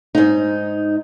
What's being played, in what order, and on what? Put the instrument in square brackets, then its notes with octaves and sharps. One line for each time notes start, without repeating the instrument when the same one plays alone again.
[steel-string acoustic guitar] G#2 D#4